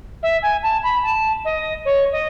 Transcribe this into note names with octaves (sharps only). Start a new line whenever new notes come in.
E5
G#5
A5
B5
A5
D#5
C#5
D#5